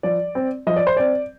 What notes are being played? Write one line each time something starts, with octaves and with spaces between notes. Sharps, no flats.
F3 D5
C4
F3 D#5
D5
C5
C4 D5